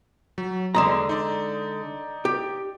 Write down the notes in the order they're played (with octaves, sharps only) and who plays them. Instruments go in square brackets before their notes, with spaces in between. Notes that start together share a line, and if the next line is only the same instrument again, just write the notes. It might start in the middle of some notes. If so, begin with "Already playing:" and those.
[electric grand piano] F#3
[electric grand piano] E2 D#6 E7 [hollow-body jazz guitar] D3 G#3 A#5
[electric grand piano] D#4 D5
[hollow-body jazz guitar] G4